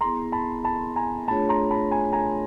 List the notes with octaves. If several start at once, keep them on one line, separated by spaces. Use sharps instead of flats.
B3 E4 G#4 A#5 C6
A5 B5
A5 B5
G#5 A#5
A3 D4 F4 G#4 C#5 A5 B5
A#5 C6
A5 B5
G#5 A#5
G#5 A#5